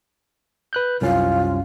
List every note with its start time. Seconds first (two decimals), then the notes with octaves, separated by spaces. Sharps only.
0.73 B4 F#6 G6
1.01 C2 F#2 C#4 F4